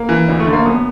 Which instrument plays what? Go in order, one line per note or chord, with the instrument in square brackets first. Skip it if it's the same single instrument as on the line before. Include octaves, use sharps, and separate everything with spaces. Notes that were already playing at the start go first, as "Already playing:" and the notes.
Already playing: [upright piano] A#3
E3
D2
A3
D3
A#3
F#2 B3